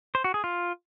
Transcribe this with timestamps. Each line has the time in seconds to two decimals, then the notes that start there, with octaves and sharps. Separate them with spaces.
0.15 C5
0.24 F#4
0.34 G#4
0.44 F4